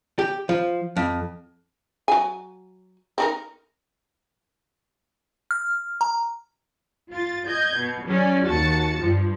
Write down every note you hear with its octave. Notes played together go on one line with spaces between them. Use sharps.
G4
F3
F2
F#3 G#5
C4 D#4 A#4
F6
A#5
F4 A6
D#5 G6 G#6
B2
F#3 C#4 D5
D#2 F#4 A5 A6 C#7
G2 F3